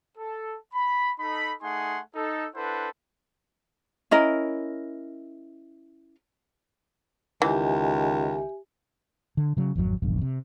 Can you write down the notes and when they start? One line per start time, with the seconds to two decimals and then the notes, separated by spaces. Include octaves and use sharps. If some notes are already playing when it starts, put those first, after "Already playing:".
0.18 A4
0.73 B5
1.20 D#4 A4 B5
1.62 A3 D#4 G#4 F#5 G#5 C6
2.15 D#4 A4
2.55 D4 E4 A4 B4 C5 F#5
4.11 C#4 E4 A#4 D#5
7.42 C#2 D#3 E3 G4 E5 G#5
9.37 D3
9.57 C#3 F#3
9.75 G#1 F2 D#3 F#3
10.02 F1 A#1 E2 G2
10.22 C3